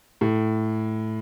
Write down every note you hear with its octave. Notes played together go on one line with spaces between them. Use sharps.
A2